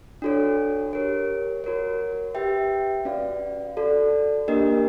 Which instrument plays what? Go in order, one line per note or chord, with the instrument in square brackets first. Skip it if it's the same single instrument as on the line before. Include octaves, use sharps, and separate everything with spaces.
[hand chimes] D4 F#4 A4 C#5
G4 A#4 C#5
F#4 A#4 C#5
G4 B4 E5 G5
C#4 F#4 B4 D5 F5
F#4 A4 D5
A#3 D4 G4 A#4 D#5